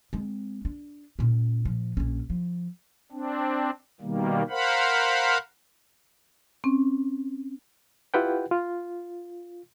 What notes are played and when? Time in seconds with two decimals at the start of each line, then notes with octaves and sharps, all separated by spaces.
0.13 G#3 C4
0.65 D4
1.19 A#2 C#4
1.65 A#2 F3
1.97 A#1 C#4
2.30 F3
3.12 C4 D4
4.01 B2 D#3 G3 A#3
4.50 A#4 C5 F5 F#5 B5
6.64 C4 C#4
8.14 E4 F4 G4 B4 F#5 G5
8.51 F4